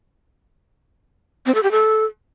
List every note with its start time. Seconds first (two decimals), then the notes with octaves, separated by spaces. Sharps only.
1.46 C4
1.55 A4
1.63 G4
1.71 A4